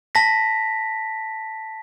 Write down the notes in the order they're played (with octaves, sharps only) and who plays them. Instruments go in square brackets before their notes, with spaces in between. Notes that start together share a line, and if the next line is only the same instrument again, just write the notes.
[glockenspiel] A5 A#6 B6